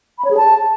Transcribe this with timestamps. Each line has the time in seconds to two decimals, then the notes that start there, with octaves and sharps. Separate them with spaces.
0.18 B5
0.25 C#5
0.31 G#4
0.37 A5